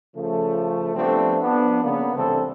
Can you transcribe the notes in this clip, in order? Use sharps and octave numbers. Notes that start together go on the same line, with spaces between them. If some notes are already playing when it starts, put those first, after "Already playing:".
C#3 F3 A3
F3 G3 A3 B3 C4 D4
F3 B3 D4
C#3 A#3 B3
C2 A2 E3 C4 D4 A4